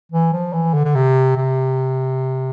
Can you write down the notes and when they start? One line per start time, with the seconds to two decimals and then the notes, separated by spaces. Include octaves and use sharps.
0.12 E3
0.33 F3
0.53 E3
0.74 D3
0.85 D3
0.95 C3
1.37 C3